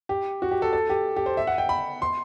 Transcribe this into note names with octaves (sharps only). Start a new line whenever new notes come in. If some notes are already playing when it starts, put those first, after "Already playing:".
G4
F#4
G4
A4
A4
G4
G4
C5
E5
F#5
G5
B5
C6